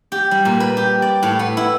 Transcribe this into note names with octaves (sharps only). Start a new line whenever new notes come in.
G4
G3
A#2
B4
G4
D5
A2
B3
E4